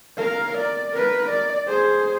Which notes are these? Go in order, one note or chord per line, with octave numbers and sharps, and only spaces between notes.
A#4 F5
D5
A#4 B4
D5
G#4 C5